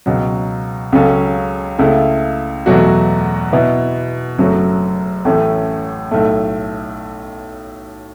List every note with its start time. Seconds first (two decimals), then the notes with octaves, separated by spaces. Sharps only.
0.06 C#2 B2 F#3
0.92 C#2 C#3 F#3 C#4 A4
1.79 C#2 C#3 A3 E4
2.66 E2 B2 F#3 A3 F#4
3.52 B2 B3 E4
4.38 F#1 F#2 F#3 A3 F#4
5.25 A1 A2 A3 C#4
6.11 B1 A2 A3